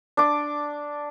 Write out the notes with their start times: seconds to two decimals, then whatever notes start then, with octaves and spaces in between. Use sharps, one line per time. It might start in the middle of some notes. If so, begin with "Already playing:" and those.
0.17 D4 D6